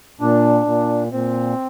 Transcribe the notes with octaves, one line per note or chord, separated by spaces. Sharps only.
A#2 D4
A#2
A#2 C4